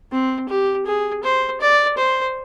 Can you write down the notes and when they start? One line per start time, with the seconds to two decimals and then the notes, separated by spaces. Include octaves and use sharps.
0.12 C4
0.49 G4
0.86 G#4
1.24 C5
1.61 D5
1.98 C5